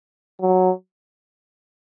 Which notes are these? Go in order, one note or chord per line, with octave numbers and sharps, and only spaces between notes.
F#3